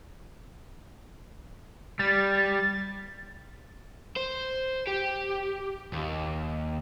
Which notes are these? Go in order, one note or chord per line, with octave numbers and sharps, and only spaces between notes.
G3 A6
C5
G4
D#2